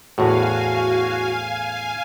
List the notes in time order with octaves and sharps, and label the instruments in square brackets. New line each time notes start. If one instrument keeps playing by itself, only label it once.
[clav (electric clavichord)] E2 A2 [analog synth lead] F#4 [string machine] F5 G#5